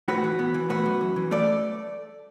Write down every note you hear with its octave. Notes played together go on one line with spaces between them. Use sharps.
A2 F#4 B4
E3
B3
E3
A3 F#4 B4
F#2
E3
E3
A3 A4 D5